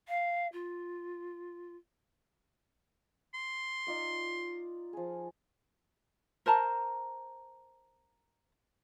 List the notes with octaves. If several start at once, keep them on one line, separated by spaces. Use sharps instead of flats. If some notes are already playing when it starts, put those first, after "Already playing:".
F5
F4
C6
D#4 F4 D5
F3 G#4
A#4 C5 A5 A#5